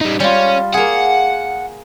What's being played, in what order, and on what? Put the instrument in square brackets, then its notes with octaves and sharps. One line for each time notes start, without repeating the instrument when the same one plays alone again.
[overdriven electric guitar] G3 D#4
[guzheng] G3 F4 [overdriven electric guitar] C#4
[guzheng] A#3 G#4 [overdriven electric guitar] F#5